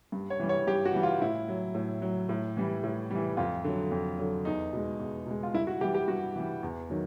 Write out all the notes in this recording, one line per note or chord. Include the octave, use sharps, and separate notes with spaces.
G2
C#5
E3 G3
C#5
G2 G4
F#4
E3 G3
F4
A2 E4
F#3
A2
F#3
A2
E3 G3
A2
E3 G3
F2 F4
D3 F#3
F2
D3 F#3
E2 D#4
B2 G#3
E2
B2 G#3
F4
G2 E4
F#4
E3 G3 G4
G4
G2 F#4
E3 G3
E2
D#3 F#3